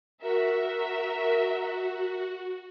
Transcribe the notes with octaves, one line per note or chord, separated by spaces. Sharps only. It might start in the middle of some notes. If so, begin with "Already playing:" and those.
F#4 A#4 E5